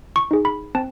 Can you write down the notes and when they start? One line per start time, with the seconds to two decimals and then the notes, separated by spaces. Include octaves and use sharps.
0.16 C#6
0.31 D#4 G#4
0.45 B5
0.75 C4 A5